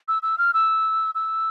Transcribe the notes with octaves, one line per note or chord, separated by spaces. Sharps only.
E6
E6
F6
E6
E6